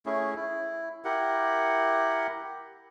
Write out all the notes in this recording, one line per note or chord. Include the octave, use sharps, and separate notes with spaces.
A3 C#4 E4 G#4
E4
E4 G4 A#4 F#5